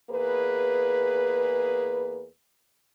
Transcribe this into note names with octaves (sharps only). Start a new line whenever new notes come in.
E2 A#3 G#4 B4